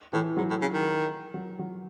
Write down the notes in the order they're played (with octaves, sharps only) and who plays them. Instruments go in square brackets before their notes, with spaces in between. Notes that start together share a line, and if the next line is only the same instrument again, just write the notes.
[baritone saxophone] A2 [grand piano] E3
[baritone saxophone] G#2 [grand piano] F#3
[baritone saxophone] A2
C#3
D#3
[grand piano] F#3
F#3